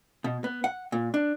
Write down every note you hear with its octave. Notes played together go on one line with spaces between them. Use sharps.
B2
B3
F#5
A#2
D4